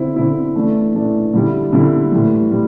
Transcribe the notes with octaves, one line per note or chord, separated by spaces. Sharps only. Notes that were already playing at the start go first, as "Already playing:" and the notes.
Already playing: D3 C4 E4
D3 C4 E4
E3 A3 D4
E3 A3 D4
D3 G3 E4
D3 G3 E4
A2 E3 G3
G3